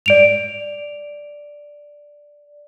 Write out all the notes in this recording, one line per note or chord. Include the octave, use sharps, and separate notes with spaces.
D5 D7 F7